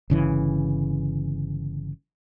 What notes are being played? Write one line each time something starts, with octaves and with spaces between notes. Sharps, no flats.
G1 C#3 E3